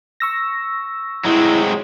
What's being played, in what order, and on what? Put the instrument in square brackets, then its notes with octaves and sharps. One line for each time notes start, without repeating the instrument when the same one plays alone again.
[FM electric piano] C#6 E6 A#6
[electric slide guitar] F#3 G#3 C4 [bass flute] E4